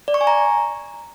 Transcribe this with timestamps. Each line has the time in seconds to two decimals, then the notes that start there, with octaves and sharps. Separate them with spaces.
0.08 D5
0.14 C#6
0.21 G#5
0.27 A#5